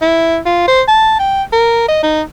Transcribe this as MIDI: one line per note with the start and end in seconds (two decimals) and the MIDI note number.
0.01 0.38 64
0.46 0.65 65
0.68 0.82 72
0.88 1.16 81
1.19 1.43 79
1.53 1.84 70
1.88 2.03 75
2.03 2.22 63